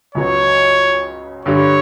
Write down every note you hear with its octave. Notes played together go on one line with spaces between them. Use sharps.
C#2 C#3 F#3 B3 C#5
G2 D3 G3 C#5